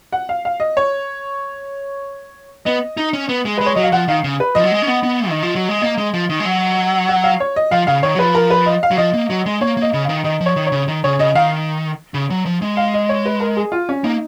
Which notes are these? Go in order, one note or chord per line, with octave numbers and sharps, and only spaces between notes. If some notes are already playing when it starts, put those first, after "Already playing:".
F#5
F5
F5
D#5
C#5
B3 D#5
D#4
C#4
B3
G#3
G#3 B4
C#5
F#3 D#5
F5
F3 F#5
D#3 F5
C#3
B4
F3 D#5
F#3
G#3
C#4
B3
B3
D#3
F3
F#3
G#3
A#3 D#5
G#3
F3
D#3
G#3
F#3
F#5
F5
C#5
D#5
F3 F5
C#3 F5
D#3 C#5
F#3
F3 B4
A#4
B4
D#5
F5
F#3
F3 D#5
A#3
F#3
G#3
A#3 C#5
A#3 D#5
C#3
D#3 F5
D#3 D#5
F3
C#5
D#3
C#5
C#3
D#3
C#3 C#5
C#3 D#5
D#3 F5
C#3
F#3
F3
G#3
F5
D#5
C#5
B4
A#4
G#4
F4
C#4
A#3 D#4